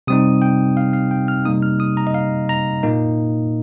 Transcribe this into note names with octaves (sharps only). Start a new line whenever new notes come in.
C3 G3 C4 D#4 D#6
G5
F5
F5
G5
F6
C3 G3 A#3 D#4 D#6
F6
D#6
A#5
D#5
F5
A#5
A#2 A#3 D#4